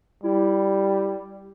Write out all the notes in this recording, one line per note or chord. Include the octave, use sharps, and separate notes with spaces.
G3 E4